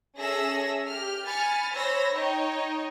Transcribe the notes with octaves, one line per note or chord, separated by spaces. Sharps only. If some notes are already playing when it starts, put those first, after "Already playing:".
C#4 G#4 A4 E5 E6 A#6
G4 F6
G#5 B5 F6 A6 C#7
C5 C#5 B5 E6 A#6
D#4 C#5 D#5 G5